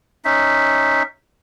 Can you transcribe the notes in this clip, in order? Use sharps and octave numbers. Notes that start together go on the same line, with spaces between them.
C#4 D#4 E5